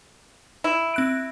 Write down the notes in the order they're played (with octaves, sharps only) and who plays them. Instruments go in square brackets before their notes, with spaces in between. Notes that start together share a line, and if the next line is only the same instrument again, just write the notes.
[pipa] E4
[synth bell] C4 F#6 D7